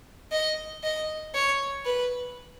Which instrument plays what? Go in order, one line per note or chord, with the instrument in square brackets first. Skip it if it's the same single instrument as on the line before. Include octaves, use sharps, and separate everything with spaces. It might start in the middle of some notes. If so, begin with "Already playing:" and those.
[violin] D#5
D#5
C#5
B4